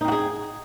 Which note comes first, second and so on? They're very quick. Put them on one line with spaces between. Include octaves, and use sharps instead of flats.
D#4 C4 F#4 G#4